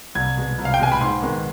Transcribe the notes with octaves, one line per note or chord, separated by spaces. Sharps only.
C2 G#6
B2 G#3
C2
F5
G5
B2 G#3 G#5
B5
G#2 C6
D#3 G#3 B3